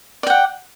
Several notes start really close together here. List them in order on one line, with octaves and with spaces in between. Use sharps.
D5 G5 F#5